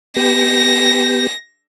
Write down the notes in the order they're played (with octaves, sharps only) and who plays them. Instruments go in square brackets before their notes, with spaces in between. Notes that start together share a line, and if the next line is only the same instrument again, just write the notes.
[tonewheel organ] B3 G4 [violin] A#6